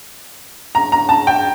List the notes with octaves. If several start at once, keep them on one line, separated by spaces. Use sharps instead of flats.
A#5
A#5
A5
G5